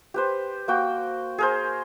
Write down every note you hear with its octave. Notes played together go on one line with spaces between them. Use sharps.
G4 B4 C5
A#3 F#4 G5
G#4 A#4 C5